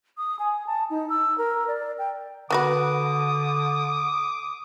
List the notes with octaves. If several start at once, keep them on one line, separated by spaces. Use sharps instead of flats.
D#6
G#5
A5
D#4
E6
A#4
D5
G5
D3 B3 F#4 B4 D6 D#6